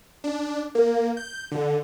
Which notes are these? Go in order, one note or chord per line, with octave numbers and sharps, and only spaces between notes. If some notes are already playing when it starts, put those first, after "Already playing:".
D4
A#3
G6
D3